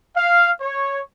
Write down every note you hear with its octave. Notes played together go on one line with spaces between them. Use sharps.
F5
C#5